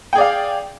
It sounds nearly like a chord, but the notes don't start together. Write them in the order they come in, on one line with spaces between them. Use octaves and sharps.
G5 G#4 D5 F5